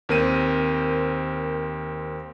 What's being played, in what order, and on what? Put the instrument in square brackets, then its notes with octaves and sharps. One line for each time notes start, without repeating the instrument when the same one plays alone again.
[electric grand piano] D#2 C4 A#4 C5 D#7